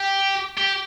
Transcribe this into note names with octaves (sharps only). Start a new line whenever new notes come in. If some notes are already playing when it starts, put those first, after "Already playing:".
Already playing: G4
G4